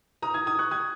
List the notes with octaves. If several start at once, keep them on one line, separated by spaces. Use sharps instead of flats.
A#5 D#6
D#6 G#6
D#6 G#6
C#6 F#6
D#6 G#6